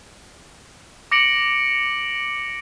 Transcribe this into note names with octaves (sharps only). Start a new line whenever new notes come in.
D6 A#6 C#7 D7 F#7